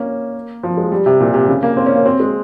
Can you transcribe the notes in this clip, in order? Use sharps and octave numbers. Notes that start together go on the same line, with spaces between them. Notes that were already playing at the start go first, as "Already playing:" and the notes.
Already playing: A#3 C#4
F3
G#3
G3
C3
A#2
C3
C#3
A#3
C4
C#4
A#3
C4
G#3